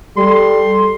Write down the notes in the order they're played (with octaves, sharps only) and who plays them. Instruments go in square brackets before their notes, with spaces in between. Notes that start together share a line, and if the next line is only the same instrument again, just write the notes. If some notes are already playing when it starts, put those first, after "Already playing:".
[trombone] G3 [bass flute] A4 [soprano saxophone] C6